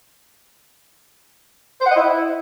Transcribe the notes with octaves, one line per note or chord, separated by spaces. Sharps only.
C5
F#5
D#5
E4